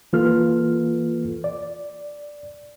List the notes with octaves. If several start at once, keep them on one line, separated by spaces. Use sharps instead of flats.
E3 A#3 F4 A4 B4 F6
D5